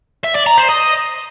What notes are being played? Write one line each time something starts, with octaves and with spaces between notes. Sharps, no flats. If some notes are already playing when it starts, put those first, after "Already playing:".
E5
D5
A#5
C5
D#5